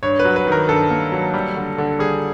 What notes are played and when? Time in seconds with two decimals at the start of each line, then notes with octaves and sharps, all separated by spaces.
0.03 G2 C#5
0.19 B4
0.25 F#3
0.36 B4
0.47 D#3 A#4
0.69 G2 A4
0.90 A#3
1.12 F#3
1.34 G3
1.56 D3
1.78 D3
1.99 G3 G#4